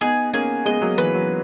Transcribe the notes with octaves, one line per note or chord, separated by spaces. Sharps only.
B3 D#4 G#4
A#3 C#4 G#4
G#3 B3 D#5
F#3 A#3
E3 B4
F#3